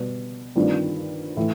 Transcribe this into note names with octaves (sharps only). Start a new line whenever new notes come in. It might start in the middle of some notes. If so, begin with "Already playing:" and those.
Already playing: B2 G3 B3
G2 D#3 G3 C4 F4
A2 E3